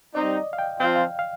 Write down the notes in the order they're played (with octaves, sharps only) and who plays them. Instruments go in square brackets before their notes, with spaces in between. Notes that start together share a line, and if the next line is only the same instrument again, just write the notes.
[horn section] G3 C4 D#4 [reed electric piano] D5
[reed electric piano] D#5
F5
G5
[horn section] F3 C4 F4 [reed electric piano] G5
[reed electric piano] F5
F5